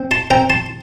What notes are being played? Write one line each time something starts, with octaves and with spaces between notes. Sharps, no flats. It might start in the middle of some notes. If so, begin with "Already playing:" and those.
Already playing: C4
A5 C6
C4 G5 A#5
A5 C6